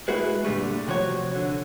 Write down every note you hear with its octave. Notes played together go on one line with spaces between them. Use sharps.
G#3 A3 E4 F#4 G#4 B4
A#2 D3 G3 A3
C3 F3 F#4 C#5
D3